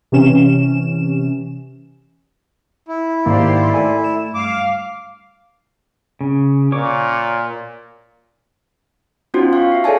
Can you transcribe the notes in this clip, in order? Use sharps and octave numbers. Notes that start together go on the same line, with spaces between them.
C3 E3 C#4 E7
E4
G#2 D#3 A#3 G4 C5 D5
A3 A4 D5 G#5
E7
G2 F5 D6
C#3
A#2 C#5 C#6 D6
B3 C#4 D#4 F4 F#4 C5
F5 C#6
E5 C7
G#4 A4 C#5 D5 G#5 A5